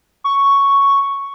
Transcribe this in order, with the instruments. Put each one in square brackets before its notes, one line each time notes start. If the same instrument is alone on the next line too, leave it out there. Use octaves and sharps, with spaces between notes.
[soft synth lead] C#6